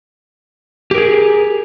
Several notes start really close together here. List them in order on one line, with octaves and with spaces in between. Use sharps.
G4 A#4 G#4